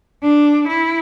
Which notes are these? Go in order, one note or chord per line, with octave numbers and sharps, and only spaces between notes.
D4
E4